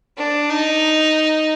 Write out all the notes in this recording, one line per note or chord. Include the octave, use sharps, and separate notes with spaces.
D4
D#4